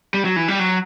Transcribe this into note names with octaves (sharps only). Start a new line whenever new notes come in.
G3
F#3
E3
G3
F#3